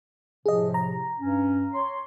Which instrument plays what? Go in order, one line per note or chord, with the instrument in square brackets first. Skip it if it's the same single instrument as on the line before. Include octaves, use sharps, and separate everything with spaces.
[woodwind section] A2 C3 F3 [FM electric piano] G#4 D#5
[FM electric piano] A#5
[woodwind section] G2 C#4
C#5 C6